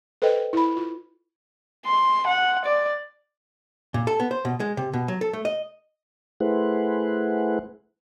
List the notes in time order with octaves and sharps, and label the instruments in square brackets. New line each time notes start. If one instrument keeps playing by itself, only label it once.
[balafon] A4 B4 C5 D#5 G5
E4 B5
F4
[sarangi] C6
F#5
D5
[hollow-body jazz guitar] A#2
A4
B3
C5
B2
G#3
C3
B2
F#3
A4
A3
D#5
[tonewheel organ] A3 E4 G#4 B4 C5 F#5